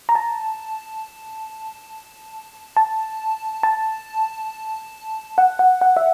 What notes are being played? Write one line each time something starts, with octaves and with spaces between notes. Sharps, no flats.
A#5
A5
A5
A5
F#5
F#5
F#5
E5